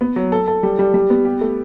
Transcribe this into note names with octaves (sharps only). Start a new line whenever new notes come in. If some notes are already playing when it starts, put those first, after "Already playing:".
B3
F#3
A4
A4
G3
G3
G3
B3
G4
A3